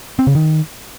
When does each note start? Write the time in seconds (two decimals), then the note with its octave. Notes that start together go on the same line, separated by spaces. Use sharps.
0.19 C4
0.27 C#3
0.35 D#3